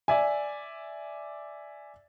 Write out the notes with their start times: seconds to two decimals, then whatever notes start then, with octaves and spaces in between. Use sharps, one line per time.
0.08 D5 E5 G#5